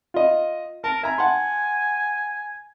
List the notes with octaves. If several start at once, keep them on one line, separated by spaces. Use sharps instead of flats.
F4 D#5
A#4 A5
E5 G#5 A#5
F#5 A5 C6